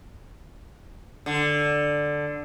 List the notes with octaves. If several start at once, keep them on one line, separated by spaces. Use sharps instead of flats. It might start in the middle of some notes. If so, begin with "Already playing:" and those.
D3